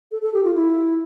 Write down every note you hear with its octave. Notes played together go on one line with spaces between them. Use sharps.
A4
A4
G4
F4
E4